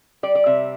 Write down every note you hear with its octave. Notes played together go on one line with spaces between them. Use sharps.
G3 D5
D5
C3 E5